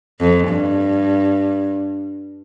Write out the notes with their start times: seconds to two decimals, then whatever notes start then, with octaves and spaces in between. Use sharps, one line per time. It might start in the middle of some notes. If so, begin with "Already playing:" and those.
0.20 F2
0.48 G2